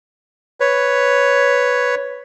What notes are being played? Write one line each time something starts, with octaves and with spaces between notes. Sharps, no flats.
B4 C#5